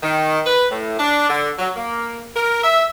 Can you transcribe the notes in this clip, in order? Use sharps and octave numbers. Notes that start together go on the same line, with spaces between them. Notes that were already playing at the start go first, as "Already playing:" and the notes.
D#3
B4
A2
D4
D3
F#3
A#3
A#4
E5